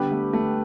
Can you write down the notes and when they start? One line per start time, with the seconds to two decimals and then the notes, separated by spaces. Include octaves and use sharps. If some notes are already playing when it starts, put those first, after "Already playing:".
Already playing: D3 G3 B3 G4 B4
0.12 A3
0.33 A3